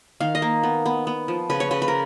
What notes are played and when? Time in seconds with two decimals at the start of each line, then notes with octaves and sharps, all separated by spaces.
0.20 D#3 F5
0.35 D#5
0.42 A#3
0.63 B3
0.86 B3
1.07 B3
1.28 F3
1.50 C#3 B4
1.60 C#5
1.71 C#3 B4
1.82 B4
1.88 A#4